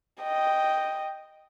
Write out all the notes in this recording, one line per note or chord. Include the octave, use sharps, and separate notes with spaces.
D#5 G5